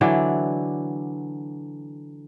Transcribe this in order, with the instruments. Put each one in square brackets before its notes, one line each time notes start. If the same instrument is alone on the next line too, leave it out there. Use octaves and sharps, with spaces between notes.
[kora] D3 E3 F#3 D5